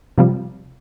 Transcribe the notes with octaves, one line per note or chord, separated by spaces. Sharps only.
C3 F3 G3